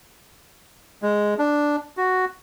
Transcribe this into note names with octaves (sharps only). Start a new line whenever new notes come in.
G#3
D4
F#4